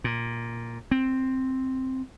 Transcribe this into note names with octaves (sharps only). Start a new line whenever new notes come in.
A#2
C4